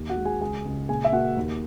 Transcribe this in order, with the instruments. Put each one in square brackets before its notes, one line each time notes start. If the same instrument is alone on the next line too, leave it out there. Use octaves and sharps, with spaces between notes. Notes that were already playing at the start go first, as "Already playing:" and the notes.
Already playing: [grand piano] D#2
F#4 F#5
G#3
G#4 G#5
C#2 G#4 G#5
C#2
A#2 G#4 G#5
E5
A#3 F#4 F#5
D#2